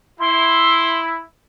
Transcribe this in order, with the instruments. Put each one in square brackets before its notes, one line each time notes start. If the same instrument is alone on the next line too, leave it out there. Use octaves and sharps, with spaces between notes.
[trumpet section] E4 [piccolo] C6